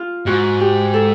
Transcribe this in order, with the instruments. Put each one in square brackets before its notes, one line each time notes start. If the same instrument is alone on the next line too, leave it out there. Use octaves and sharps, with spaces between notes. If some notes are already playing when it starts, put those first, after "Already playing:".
Already playing: [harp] F4
[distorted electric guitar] G#2 [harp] F#4
[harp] G4
A4